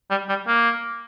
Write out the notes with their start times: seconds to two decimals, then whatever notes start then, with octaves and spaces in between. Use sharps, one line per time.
0.10 G3
0.29 G3
0.47 A#3